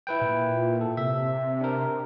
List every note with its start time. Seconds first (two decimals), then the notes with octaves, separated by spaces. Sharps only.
0.07 E4 B4 G5
0.21 A#2
0.81 A4
0.97 C3 E5
1.61 D4 A#4